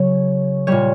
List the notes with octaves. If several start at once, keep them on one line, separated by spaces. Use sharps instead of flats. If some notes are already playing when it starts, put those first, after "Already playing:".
Already playing: C#3 F#3 C#5
A#2 G3 C#5